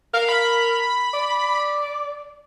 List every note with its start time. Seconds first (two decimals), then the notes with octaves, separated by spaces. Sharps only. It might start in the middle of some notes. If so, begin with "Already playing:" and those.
0.14 A#4 F5
0.29 B5
1.14 D5